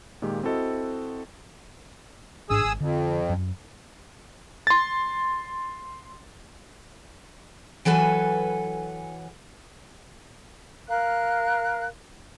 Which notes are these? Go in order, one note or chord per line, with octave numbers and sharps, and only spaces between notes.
A#2 D#3 G#3 F4 G4
C4 E4 F#4 A4 C5 D#5
A1 G#2 D4 G#4 D#6 E6
G#1
F2 D3
F#2
C6 A6
E3 F#3 A4 B4 G#5
A#4 F5 F#6